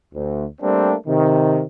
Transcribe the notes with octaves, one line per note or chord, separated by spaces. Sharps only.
D2
G3 A3 A#3 C4 D4
C3 D#3